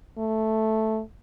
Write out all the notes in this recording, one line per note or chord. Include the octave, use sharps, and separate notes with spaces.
A3